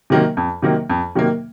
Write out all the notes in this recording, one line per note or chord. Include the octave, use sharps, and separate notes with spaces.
C3 D#3 F#3 A#3
F2
C3 D#3 F#3 A#3
F2
C3 D#3 F#3 A#3